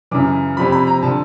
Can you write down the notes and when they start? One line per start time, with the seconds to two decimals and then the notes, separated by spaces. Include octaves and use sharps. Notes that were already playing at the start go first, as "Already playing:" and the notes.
0.11 F#2 C#3 E3 D6
0.57 F2 C3 F3 B5
0.72 B5
0.87 A#5
1.02 D3 F3 A5